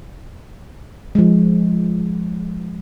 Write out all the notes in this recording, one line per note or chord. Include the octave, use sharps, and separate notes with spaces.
F3 G#3